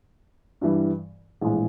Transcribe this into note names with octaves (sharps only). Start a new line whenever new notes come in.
G2 E3 G3
A#1 A2 E3 G#3